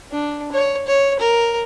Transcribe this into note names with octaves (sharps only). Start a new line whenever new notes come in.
D4
C#5
C#5
A#4